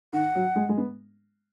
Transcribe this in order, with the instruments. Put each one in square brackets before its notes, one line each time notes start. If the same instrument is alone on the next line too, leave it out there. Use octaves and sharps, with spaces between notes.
[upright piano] D#3 [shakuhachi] F#5
[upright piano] F#3
G#3
G#3
B3